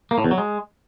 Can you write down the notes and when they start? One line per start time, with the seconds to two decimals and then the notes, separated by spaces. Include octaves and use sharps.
0.11 A#3
0.18 A2
0.24 E2
0.31 F#3
0.38 G#3